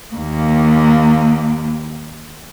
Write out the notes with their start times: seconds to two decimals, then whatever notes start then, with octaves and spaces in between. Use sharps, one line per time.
0.13 D#2 A#3